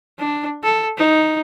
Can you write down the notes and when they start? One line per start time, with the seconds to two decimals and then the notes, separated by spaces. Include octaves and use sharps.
0.19 D4
0.63 A4
0.98 D#4